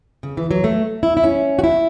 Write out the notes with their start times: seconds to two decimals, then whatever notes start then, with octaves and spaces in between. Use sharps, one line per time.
0.23 C#3
0.37 E3
0.51 F#3
0.64 A3
1.03 E4
1.17 E4
1.24 C#4
1.59 F#4
1.64 E4